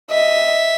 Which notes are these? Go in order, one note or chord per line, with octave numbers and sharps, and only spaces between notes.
D#5 E5